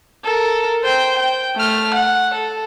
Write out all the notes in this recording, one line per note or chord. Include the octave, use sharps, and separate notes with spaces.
A4 A#4
C5 G5
G5
A3 F6
F#5
A4